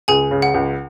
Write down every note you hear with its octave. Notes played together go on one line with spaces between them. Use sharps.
C#2 G#4 G#5
C#3
F#5
C#2